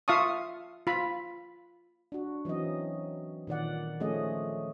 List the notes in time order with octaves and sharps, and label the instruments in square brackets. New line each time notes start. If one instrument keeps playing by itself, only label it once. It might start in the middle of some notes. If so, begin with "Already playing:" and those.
[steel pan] F4 E5 F5 A5 C#6 D#6
F4 B5
[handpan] D4 F#4
E3 F#3 C4 C#4 D#5
A#2 D#3 D5 F#5
F3 A3 C#4 G#4 D#5